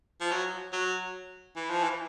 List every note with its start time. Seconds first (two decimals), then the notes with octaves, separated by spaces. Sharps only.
0.20 F3
0.31 F#3
0.73 F#3
1.56 E3
1.70 F3
1.83 E3